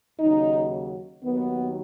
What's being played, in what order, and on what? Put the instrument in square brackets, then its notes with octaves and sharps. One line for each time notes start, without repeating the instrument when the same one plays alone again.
[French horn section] D#2 C#3 F#3 D#4
D#2 D#3 F#3 B3